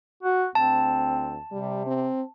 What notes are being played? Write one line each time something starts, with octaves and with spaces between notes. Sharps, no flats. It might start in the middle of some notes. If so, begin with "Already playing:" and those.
F#4
D2 C4 A5
C3 G3
C4